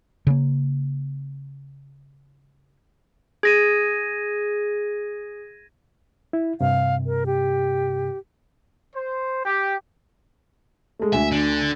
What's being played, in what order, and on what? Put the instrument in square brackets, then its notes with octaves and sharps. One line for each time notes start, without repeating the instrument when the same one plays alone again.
[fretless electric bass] C#3 A#3
[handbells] G#4 [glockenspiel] G#6 A#6 D#7
[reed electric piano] E4
[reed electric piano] G2 C3 [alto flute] F5
[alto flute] A#4
G4
[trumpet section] C5
G4
[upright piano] G#3 A3
[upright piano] D2 G#5 [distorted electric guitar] E5
[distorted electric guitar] D3